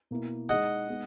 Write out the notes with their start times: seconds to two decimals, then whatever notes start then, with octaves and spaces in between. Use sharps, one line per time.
0.11 B2 A#3 E4
0.49 G#3 D#4 G#4 D#5 F#5
0.88 G#3 B3 D#4